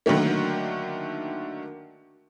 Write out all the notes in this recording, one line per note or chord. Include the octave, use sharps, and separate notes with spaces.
D3 D#3 F#3 A3 A#3